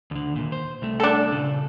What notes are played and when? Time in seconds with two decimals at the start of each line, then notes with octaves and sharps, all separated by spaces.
0.11 D2 D3
0.36 D#2 A#2
0.52 C5
0.82 C2 A3
1.00 D4 A4
1.32 A#2 C#3